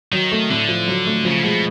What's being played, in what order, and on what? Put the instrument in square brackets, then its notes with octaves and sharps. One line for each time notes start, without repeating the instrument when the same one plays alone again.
[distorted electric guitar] D#3 [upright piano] F#3
[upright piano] A3
[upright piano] A2 [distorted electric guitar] D3
[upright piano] F3
F#3
A3
[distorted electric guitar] C#3 [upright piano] F3
[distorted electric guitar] B2 [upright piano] G#3